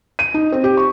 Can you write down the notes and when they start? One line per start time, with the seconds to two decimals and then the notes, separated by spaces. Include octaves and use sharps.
0.19 D#7
0.34 D#4
0.52 C4
0.64 G4
0.77 C#6